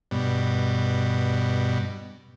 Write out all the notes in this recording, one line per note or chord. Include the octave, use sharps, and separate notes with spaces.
G2 B2